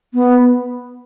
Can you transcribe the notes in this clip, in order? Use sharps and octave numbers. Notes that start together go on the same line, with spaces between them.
B3